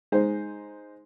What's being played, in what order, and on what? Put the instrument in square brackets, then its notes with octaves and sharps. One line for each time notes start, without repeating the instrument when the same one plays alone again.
[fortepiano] G#3 D#4 C5